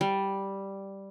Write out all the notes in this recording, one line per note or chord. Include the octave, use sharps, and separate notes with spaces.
G3